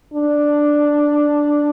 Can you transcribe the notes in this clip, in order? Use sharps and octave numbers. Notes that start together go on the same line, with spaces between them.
D4